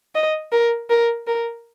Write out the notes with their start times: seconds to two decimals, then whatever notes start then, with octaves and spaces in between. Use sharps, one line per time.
0.15 D#5
0.52 A#4
0.90 A#4
1.27 A#4